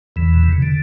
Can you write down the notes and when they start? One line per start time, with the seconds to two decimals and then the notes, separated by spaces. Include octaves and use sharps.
0.16 E2 E3
0.34 B2
0.43 C3
0.53 C#3
0.62 D3